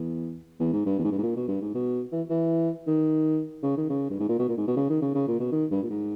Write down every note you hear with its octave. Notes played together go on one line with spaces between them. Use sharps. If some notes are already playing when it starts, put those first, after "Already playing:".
Already playing: E2
E2
G#2
G2
E2
G#2
G2
G#2
A#2
B2
G2
G#2
B2
E3
E3
D#3
C#3
D#3
C#3
G2
G#2
A#2
B2
A#2
G#2
B2
C#3
D#3
C#3
C#3
A#2
B2
D#3
G2
A#2
G#2